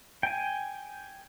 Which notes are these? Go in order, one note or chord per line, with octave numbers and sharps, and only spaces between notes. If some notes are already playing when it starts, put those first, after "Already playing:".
G5 G#5